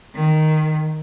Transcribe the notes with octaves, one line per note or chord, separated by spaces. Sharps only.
D#3